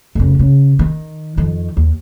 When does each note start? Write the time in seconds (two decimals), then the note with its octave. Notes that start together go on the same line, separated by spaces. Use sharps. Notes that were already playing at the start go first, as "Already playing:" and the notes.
0.15 F1 C#3
0.39 C#3
0.79 D#3
1.37 F2 D#3
1.77 D#2